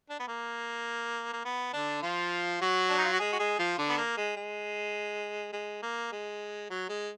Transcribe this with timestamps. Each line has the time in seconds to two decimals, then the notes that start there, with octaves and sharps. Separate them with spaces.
0.10 D4
0.19 B3
0.28 A#3
1.33 A#3
1.45 B3
1.73 D3 D4
2.02 F3 F4
2.61 F#3 F#4
2.90 D4
2.98 D#4
3.05 F4
3.13 F#4
3.19 G#3 G#4
3.33 F#4
3.39 G#3 G#4
3.59 F3 F4
3.78 D3 D4
3.89 B3
3.97 A#3
4.17 G#3
4.37 G#3
5.53 G#3
5.82 A#3
6.12 G#3
6.70 F#3
6.89 G#3